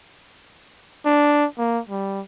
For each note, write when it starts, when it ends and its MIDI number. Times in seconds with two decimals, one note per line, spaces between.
1.06 1.46 62
1.58 1.80 58
1.89 2.21 55